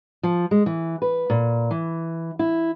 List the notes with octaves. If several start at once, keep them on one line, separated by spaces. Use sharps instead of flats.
F3
G#3
E3
B4
A#2
E3
E4